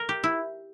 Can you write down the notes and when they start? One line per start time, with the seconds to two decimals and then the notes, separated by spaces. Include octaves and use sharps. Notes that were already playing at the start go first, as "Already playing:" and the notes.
Already playing: A#4
0.09 G4
0.24 E4